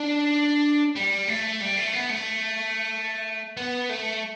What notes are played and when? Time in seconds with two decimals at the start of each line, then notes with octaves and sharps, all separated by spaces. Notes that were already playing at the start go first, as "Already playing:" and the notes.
Already playing: D4
0.96 G3
1.28 A3
1.61 G3
1.77 A3
1.94 B3
2.10 A3
3.57 B3
3.89 A3